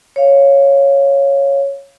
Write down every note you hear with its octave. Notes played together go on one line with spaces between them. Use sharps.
C#5 F5